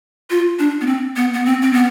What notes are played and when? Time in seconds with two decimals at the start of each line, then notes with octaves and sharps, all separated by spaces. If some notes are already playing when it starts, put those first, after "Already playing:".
0.30 F4
0.59 D4
0.81 B3
0.87 C4
1.16 B3
1.34 B3
1.45 C4
1.62 C4
1.73 B3